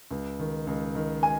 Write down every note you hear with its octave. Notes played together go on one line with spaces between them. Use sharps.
C#2
D#3
C#2
D#3
G#5